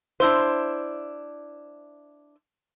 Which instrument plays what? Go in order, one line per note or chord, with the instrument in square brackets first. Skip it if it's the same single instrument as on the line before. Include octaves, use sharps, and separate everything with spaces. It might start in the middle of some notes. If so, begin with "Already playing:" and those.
[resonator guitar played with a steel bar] D4 E4 C5